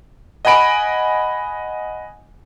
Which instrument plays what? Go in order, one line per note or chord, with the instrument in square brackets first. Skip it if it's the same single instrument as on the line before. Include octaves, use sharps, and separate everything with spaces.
[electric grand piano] D#5 F#5 G#5 B5 D7